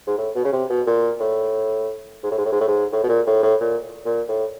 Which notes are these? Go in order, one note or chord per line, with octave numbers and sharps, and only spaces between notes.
G#2
A2
B2
C#3
C3
B2
A#2
A2
G#2
A2
G#2
A2
G#2
A2
G#2
A2
B2
A#2
A2
A2
A#2
A#2
A2